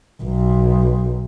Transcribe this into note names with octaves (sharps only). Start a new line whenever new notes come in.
B1